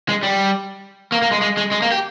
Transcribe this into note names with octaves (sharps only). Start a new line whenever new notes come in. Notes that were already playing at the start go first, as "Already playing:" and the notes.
G#3
G3
A#3
A#3
G#3
G#3
G#3
G#3
A#3
G4